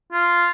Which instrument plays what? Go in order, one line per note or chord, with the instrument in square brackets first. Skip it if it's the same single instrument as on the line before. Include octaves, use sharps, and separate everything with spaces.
[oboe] F4